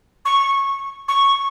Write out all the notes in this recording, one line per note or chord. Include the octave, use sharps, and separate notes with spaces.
C#6
C#6